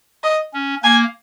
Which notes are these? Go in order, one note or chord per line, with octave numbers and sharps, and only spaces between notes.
D#5
C#4
A#3 G#5